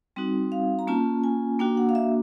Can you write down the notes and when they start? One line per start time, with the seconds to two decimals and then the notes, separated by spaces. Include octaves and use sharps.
0.16 G3 C4 D#4 F#4
0.52 F5
0.79 A#5
0.87 A#3 C#4 F4 A5
1.24 G#5
1.59 A#3 D4 F#4 G5
1.77 F#5
1.89 F5
1.95 E5